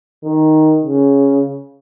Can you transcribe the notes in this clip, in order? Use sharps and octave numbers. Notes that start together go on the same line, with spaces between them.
D#3
C#3